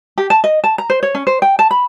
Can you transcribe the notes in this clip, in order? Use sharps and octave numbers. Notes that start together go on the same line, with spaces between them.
G4
A5
D#5
A5
A#5
C5
C#5
C#4
C5
G5
A5
B5